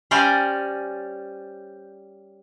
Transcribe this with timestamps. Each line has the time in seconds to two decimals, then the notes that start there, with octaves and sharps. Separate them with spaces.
0.11 G3 C#4 C5 D5 G#5 A#5